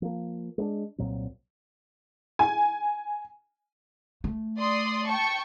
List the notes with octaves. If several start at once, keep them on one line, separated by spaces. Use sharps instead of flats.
F3 A#3
G#3 B3 D4
C2 A#2 F#3 C4
G#5
A3
D5 C6 D#6
G5 A5 C#6